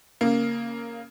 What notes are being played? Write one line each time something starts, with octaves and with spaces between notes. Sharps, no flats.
C#3 A#3